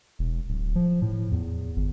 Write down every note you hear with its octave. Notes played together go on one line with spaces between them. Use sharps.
E1
D1
F3
A2
E2
G1